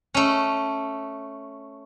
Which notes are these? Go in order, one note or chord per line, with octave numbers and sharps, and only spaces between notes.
A3 C#4